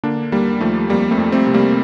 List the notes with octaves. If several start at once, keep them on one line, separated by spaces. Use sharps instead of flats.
D3 A#3 D4
D#2 G3 A#3
D#2 F3 A3
F2 G3 A#3
A3 C4
F2
A3 C4
C3
G3 A#3